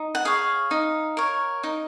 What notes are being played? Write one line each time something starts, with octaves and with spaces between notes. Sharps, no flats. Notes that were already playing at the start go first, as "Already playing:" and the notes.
Already playing: D#4
F#5
G#4 C#5 F5
D#4
A#4 C#5
D#4